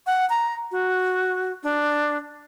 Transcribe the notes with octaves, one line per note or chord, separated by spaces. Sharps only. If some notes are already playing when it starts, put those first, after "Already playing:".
F#5
A#5
F#4
D4